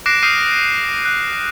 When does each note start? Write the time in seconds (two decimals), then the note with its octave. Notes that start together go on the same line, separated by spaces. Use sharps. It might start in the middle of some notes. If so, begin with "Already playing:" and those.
0.06 D6 F#6 A#6 C7 D7 E7
0.22 D#6 F6 G6 C7 D#7
1.05 F#6